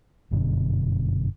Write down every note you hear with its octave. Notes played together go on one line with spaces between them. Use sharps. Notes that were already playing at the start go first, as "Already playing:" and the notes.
G1 F#2 B2 D3